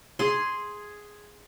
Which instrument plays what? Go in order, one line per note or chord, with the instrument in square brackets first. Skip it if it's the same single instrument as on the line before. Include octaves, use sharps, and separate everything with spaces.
[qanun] G#4 C6